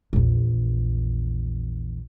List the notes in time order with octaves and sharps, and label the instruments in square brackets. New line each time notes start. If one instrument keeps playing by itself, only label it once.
[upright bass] A#1 E2